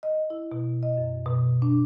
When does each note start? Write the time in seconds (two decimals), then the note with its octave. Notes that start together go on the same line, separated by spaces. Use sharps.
0.03 D#5
0.30 E4
0.52 B2
0.83 D#5
0.97 F#2
1.26 B2
1.62 D4